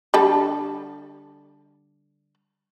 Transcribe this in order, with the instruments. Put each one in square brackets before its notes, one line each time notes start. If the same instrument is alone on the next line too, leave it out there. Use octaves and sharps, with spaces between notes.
[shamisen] D3 G3 A4